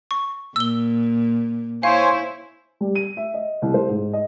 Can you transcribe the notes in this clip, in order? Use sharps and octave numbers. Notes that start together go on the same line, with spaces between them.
C#6
A#2 E6 G7
E4 C5 C#5 F5 G#5
G3
D#7
E5
D#5
C2
C5
G#2
D#5